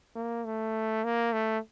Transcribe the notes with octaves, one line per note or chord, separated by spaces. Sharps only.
A#3
A3
A#3
A3